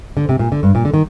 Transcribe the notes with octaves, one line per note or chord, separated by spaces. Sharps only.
D3
C3
A#2
D3
G2
A#2
D3
D#3